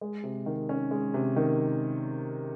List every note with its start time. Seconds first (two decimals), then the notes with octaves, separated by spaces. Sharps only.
0.01 G#3
0.23 C3
0.46 D#3
0.69 C#4
0.91 G#3
1.14 C3
1.36 D#3